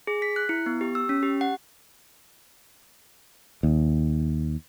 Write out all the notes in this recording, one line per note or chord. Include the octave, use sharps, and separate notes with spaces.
G#4
B6
F#6
E4
B3
G4
E6
C#4
G4
F#5
D#2